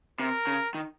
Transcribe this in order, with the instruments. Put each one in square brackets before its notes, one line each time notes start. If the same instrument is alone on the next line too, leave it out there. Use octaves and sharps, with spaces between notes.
[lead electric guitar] C3 [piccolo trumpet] A#4
[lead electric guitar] C#3
D#3